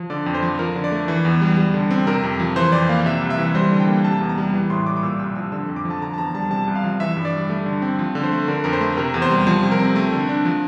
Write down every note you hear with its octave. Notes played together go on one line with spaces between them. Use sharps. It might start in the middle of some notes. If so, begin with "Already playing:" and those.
Already playing: F3
D3 D5
F2
C5
F3
F3 A#4
D3
D5
A3
E3
E2
G3
G3
D3
C4
C3 A#4
F2
F3
E3 C5
F2 D5
A#3 F5
C3 E5
C2
E5
E3
G3 C5
D3
G5
A#3
C3 A5
E2
A#5
G3
E3
A2 C6
G3 D6
D6
A#2 E6
C2 E6
F3 E6
D3 E6
F2
D6
F3
A5
D3 A#5
A5
E2 A#5
G3 A5
C3 A5
C2
F5
F3
E3 E5
G2
D5
G3
A3
D3
C4
F3
D3
C5
A3
D3 A#4
F2 A#4
C5
A3
C3 A#4
E2
C5
G3
F3 C5
C3
A#4
C4
A3
D3
D4
F3